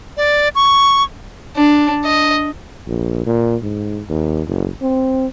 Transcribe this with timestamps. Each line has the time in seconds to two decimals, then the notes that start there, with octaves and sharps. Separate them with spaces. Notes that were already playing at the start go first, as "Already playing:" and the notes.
0.17 D5
0.55 C#6
1.56 D4
2.05 D#5
2.88 A#1
3.26 A#2
3.63 G#2
4.10 D#2
4.47 F#1
4.82 C4